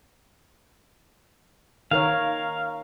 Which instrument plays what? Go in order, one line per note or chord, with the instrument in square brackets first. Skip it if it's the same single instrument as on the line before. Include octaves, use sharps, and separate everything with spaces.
[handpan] D#3 A#4 C#5 [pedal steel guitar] F5